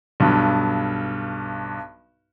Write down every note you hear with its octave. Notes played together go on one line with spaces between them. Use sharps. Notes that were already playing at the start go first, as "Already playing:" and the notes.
B1 G2